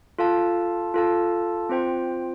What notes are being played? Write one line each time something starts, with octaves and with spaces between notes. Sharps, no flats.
F4 A4 F5 A5
F4 A4 F5 A5
C4 F4 C5 G5